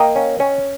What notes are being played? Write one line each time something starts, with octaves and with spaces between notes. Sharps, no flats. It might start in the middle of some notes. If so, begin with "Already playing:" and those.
Already playing: A#3 D#5 G5
C#4
C#4